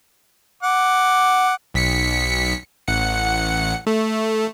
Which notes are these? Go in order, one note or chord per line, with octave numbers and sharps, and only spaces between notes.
F#5 D6
B1 B6 C#7
A1 F#5 C#7
A3